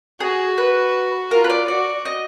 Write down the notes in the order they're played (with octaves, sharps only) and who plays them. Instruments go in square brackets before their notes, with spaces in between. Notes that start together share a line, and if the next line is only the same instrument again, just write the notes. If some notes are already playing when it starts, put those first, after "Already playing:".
[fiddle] F#4 [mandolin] G#4
[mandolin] B4
[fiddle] F4 [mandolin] A#4
[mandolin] B4
D5
[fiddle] F#4 [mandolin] D5
[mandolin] D#5